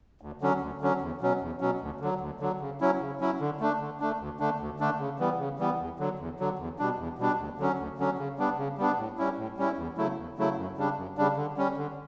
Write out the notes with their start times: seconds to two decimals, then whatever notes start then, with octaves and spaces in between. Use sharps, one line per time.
0.21 D2
0.41 D3 F#3 C#4
0.61 D2
0.81 D3 F#3 C#4
1.01 E2
1.21 B2 F#3 C#4
1.41 E2
1.61 B2 F#3 C#4
1.81 D2
2.00 D3 F#3
2.21 D2
2.40 D3 F#3
2.60 C#3
2.80 F#3 C#4 E4
3.01 C#3
3.20 F#3 C#4 E4
3.40 D3
3.60 A3 D4
3.80 D3
4.00 A3 D4
4.20 D2
4.40 D3 A3 D4
4.60 D2
4.79 D3 A3 D4
4.99 C#3
5.19 E3 G3 B3
5.39 C#3
5.59 E3 G3 B3
5.79 E2
5.99 D3 F#3
6.19 E2
6.39 D3 F#3
6.59 E2
6.79 B2 G3 D4
6.99 E2
7.18 B2 G3 D4
7.39 D2
7.58 D3 F#3 C#4
7.79 D2
7.98 D3 F#3 C#4
8.18 C#3
8.39 G3 B3 D4
8.58 C#3
8.78 G3 B3 D4
8.98 A2
9.18 G3 C#4 E4
9.38 A2
9.57 G3 C#4 E4
9.78 E2
9.97 C#3 F#3 A3 E4
10.18 E2
10.38 C#3 F#3 A3 E4
10.57 F#2
10.77 C#3 G3 D4
10.97 F#2
11.17 C#3 G3 D4
11.37 D3
11.57 G3 C#4
11.77 D3